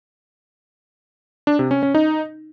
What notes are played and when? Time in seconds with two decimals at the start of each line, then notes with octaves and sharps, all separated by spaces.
1.47 D4
1.59 C3
1.71 C#4
1.83 C#4
1.95 D#4